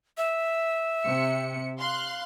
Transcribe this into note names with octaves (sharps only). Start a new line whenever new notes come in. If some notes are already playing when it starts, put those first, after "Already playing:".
E5
C3 C#7
F5 C6 F#6